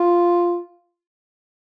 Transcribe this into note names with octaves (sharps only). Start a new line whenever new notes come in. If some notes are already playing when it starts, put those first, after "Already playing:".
Already playing: F4